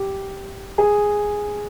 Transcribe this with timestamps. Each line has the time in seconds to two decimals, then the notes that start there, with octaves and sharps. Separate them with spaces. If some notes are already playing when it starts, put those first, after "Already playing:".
Already playing: G4
0.78 G#4